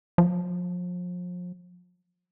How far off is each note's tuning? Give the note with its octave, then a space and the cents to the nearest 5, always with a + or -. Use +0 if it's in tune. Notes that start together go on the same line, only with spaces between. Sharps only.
F3 +35